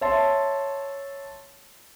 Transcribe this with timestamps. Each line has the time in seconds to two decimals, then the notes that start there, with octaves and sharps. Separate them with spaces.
0.01 C#5 E5 A5 C6